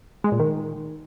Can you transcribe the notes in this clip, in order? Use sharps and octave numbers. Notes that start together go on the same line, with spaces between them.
G#3
A#2
D#3